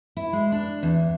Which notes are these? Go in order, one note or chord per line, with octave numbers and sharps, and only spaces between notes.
E4
G#3
D4
E2